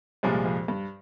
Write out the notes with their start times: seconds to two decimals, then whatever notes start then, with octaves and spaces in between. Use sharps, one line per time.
0.23 C2 G2 A#2 F3 G#3
0.46 F2
0.68 G2